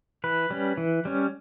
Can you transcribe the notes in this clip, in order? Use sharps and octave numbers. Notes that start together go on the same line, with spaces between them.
E3 B4
G3 C#4
E3
G3 C#4